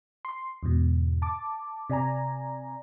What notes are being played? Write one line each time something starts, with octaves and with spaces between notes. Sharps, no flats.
C6
E2 G#2 B2
A5 D6
C3 D5 G#5 A#5